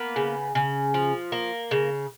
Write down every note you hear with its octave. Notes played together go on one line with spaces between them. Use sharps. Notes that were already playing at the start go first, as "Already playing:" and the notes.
Already playing: A#3 B3 B4
C#3
C#3
F3
A#3
C#3